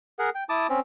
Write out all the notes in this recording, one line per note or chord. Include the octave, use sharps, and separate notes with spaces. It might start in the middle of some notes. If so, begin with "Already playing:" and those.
G#4 A#4 F#5
G5
E4 A5 D6 D#6
C4 C#4